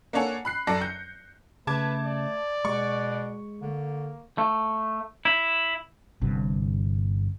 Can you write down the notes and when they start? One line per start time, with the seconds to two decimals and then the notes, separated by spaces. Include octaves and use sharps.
0.13 A#3 D4 A4 C#5 F#5 G#5
0.45 B5 F#6 C7
0.67 F#2 A4 D5 A5 A#6
0.81 G6 C#7
1.67 C#3 A3 B4 A5 D6 G#6
2.06 D5
2.65 B2 G#3 C#6
3.62 D3 A#3
4.38 A3
5.25 E4
6.22 G1 G2 C3